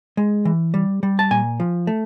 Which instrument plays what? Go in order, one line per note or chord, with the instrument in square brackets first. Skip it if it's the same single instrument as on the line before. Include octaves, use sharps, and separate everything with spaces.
[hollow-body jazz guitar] G#3
E3
G3
G3
A5
A#2 G#5
F3
A3